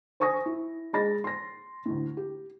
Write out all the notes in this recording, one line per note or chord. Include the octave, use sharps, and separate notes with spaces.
C5 G#5 C#6 D#6 A#6
E4
G#3 D#5 B5 A6 A#6
C6 A#6
D2 A2
G4